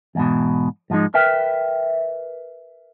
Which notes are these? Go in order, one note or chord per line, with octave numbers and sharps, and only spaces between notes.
E2 G#2 B2
G#2 F3 F#3 G#3 D#4
A#4 B4 E5 G5